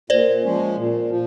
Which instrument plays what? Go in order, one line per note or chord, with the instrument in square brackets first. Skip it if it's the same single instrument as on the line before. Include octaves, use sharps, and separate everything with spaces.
[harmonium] A#2 [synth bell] C5 D5
[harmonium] F3 G#3 C#4
A#2
F3